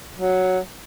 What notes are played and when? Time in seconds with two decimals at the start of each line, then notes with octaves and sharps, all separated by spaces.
0.17 F#3